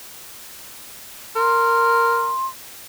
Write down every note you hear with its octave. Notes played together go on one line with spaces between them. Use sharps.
A#4 C6